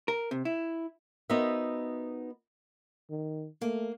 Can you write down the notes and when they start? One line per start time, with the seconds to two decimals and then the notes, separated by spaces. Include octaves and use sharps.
0.08 A#4
0.31 C3
0.45 E4
1.30 B3 D#4 F#4 A#4 C5 E5
3.10 D#3
3.61 A3 A#3